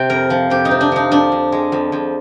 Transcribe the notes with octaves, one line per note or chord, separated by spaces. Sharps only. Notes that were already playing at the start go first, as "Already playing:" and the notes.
Already playing: C3 G5
F2 A#4
F3
F2 G4
D#4
C3
D4
F3 D#4
F2 D4
F2
G#3
F2
F2